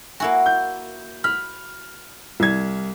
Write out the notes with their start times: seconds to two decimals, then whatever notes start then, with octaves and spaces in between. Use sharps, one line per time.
0.20 A#3 E4 F#4 G#5
0.46 G6
1.24 B5 F6
2.40 C2 G#6